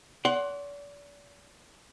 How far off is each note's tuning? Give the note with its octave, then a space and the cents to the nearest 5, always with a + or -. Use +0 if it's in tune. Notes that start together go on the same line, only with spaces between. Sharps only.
D5 -40 F#5 +10 C6 +20